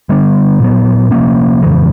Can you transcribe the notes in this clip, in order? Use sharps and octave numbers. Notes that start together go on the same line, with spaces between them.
D3 G3 B3 D4
A#2 F#3 B3
C3 F3 A#3 C#4
F2 C#3 E3 G#3